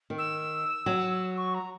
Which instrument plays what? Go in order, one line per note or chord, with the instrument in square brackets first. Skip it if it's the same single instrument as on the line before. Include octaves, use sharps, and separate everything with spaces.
[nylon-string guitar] D#3
[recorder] E6
[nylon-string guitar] F#3
[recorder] C#6
A#5